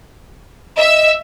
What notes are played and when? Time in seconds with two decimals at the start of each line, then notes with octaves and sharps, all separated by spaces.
0.77 D#5 E5 E6